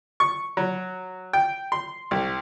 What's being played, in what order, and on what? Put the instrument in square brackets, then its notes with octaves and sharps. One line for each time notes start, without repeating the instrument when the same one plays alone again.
[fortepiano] C#6
F#3
G5
C6
C2